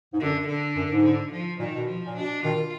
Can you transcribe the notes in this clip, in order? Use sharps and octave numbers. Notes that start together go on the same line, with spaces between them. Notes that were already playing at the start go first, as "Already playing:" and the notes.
G#2
F#2 D3
D3
F#2
G#2
D3
F3
A#2 D#3
B2
F3
A#2
B2 D4
B2 D#3 F4